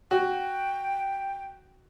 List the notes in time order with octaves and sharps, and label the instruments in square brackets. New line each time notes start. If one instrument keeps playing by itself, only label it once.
[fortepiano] F#4 [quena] G5